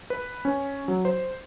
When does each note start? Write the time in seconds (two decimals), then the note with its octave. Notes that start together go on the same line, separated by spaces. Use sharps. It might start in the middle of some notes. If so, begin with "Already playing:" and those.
0.10 B4
0.45 C#4
0.88 F#3
1.05 C5